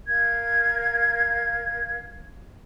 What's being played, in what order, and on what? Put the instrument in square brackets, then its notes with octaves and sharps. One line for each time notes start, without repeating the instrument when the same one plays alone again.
[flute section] A#4 F5 G#6